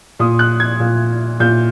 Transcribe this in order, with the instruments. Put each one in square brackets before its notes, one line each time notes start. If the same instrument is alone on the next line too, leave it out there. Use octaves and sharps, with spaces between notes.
[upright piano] A#2 D#6
F#6
G#6
A#2
A#2 G6